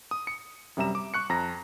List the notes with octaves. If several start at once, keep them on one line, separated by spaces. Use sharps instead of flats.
D#6
C#7
F#2 C3 G3 E5 A#5 E7
D6
C#6 F#6 C#7
F2 A#5 A#6